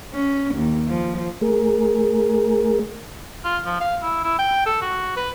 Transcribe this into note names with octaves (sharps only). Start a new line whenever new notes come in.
C#4
D#2
F3
A3 G#4 A#4
F4
F3
F5
E4
E4
G5
A4
F#4
B4